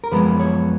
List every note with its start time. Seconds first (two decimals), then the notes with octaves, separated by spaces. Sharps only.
0.04 A#4
0.12 F#2 F3 G#3 B3 B4
0.40 C#5